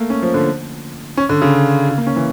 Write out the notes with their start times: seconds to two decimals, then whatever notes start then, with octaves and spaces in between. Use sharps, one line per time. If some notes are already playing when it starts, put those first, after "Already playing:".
Already playing: A3 A#3
0.10 C#4
0.22 F3
0.34 D3
1.17 C#4
1.29 D3
1.42 C#3
1.89 C#3
1.98 A#3
2.07 C#4
2.16 E3